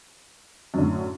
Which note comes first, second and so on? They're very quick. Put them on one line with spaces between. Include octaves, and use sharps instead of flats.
F#2 D3 A2